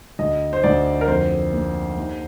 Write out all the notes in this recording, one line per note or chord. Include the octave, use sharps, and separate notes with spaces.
D2 D#5
C5
D2 D5
A#4
F2 C5
A#3
D#2